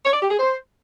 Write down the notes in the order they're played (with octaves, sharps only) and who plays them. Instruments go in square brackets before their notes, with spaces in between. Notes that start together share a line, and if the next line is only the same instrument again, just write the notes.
[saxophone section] C#5
D5
G4
G#4
C5